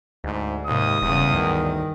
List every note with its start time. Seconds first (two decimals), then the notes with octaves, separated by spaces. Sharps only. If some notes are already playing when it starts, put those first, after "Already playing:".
0.24 D2 G#2
0.67 D#2 G#2 C3 D#6
1.02 E1 E2 G2 C#3
1.34 D2 D#3